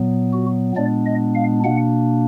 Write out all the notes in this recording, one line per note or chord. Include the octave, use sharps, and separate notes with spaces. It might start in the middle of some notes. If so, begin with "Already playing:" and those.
Already playing: A#2 F#3 B3
F#4
A#2 G#3 B3 D4 D5
D#5
F5
B2 A#3 D4 F#5